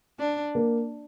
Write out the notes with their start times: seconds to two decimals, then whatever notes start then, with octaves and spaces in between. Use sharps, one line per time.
0.19 D4
0.55 A#3